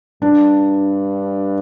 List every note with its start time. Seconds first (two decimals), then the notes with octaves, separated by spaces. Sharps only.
0.22 G2 D4